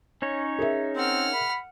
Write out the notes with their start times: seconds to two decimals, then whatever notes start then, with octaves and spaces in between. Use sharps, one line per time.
0.22 C#4 D#4 C#5
0.59 G#4 A#4 E5
0.96 C4 F#5 F6
1.34 B5